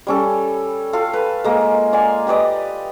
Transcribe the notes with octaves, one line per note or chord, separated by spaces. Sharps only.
G3 C#4 A4
F4 A4 F5
B4
G#3 A#3 A#4
D5 F5 G#5
G4 B4 D5 D#5